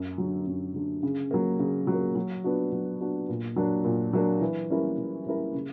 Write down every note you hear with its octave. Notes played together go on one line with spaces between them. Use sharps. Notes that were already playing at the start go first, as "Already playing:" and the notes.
Already playing: F#2
D3 F#3
F#2
D3 F#3
C#3
F#3 A#3
C#3
F#3
A#3
F#3
B3 D4 F#4
F#3
B3 D4 F#4
A#2
F#3 A#3 D4
A#2
F#3 A#3 D4
E3
G3 C#4 E4 A#4
E3
G3 C#4 E4 A#4
C#3